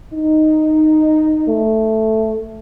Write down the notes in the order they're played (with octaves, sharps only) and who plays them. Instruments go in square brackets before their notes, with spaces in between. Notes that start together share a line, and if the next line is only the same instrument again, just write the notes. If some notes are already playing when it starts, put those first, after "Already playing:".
[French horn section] D#4
[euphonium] A3